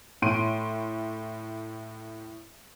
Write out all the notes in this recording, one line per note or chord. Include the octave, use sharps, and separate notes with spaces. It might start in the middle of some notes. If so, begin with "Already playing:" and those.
A2 C6 D7 D#7